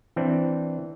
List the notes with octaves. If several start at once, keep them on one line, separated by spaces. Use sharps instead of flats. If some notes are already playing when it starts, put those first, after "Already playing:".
E3 C4 D4